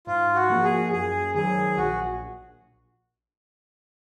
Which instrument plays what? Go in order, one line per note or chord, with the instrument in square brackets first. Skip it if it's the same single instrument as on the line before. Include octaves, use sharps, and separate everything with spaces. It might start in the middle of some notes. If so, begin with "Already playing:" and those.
[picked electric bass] G#2 [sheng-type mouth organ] F4
[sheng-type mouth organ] F#4
[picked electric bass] F3 A#3
[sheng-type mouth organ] G#4
[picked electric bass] F#2 [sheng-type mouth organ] G#4
[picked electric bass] D#3 F#3 [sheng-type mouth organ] G#4
[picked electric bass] A#1 [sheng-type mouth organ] F#4